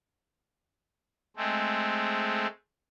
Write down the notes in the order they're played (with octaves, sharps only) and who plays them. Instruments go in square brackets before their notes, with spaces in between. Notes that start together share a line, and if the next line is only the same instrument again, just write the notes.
[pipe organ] G#3 A3 C4